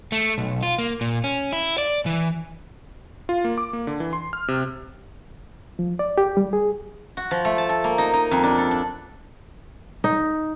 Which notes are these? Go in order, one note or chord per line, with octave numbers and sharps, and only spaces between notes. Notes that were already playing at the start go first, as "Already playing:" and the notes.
A3
B1
F4
A#3
A#2
C#4
E4
D5
E3
F4
A#3
D6
A#3
D3
E3
C6
F6
C3
F3
D5
G4
G3
G#4
F#4
F3
A3
A5
A4
A#3
D#4
D#4
F2
D4
A4
D4
D#4